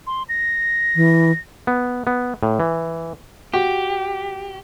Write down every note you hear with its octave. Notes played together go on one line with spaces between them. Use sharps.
C6
A#6
E3
B3
B3
A2
E3
F#4 G4